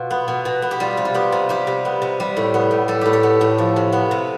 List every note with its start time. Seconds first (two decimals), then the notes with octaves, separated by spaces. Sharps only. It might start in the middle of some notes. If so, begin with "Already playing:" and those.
Already playing: B2 F4
0.10 B3
0.28 B2
0.45 B2
0.62 B3
0.71 G4
0.80 G3 F4
0.97 C3
1.05 F4
1.14 B3 G4
1.32 C3
1.49 G3 G4
1.67 C3
1.85 B3
2.02 C3
2.20 G3
2.37 A2
2.54 B3
2.71 A2
2.88 G3 A4
3.01 A2 G4
3.13 A4
3.23 B3
3.41 A2
3.58 F3
3.76 C3
3.92 B3
4.11 C3